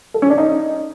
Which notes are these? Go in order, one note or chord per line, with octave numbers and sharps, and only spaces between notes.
A4
C#4
D4
D#4